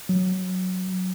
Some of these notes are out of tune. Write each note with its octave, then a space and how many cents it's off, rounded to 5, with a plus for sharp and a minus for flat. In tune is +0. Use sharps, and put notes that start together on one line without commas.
F#3 -5